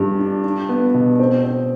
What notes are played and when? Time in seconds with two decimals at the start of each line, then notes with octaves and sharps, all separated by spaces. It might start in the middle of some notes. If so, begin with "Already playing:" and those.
Already playing: G2 D4
0.19 D4
0.44 D4
0.69 B3
0.94 B2
1.19 C4
1.44 C4